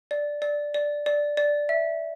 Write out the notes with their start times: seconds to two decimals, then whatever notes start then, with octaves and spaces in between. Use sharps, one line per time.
0.11 D5
0.42 D5
0.74 D5
1.06 D5
1.37 D5
1.69 E5